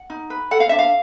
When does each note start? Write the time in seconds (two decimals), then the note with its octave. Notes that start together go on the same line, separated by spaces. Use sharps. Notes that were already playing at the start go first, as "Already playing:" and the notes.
Already playing: F#5
0.10 D#4
0.30 B4
0.51 A4 F#5
0.60 F5
0.69 D4 E5
0.79 F5